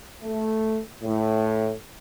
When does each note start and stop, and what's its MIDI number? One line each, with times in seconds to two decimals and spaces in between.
0.23 0.80 57
1.03 1.73 45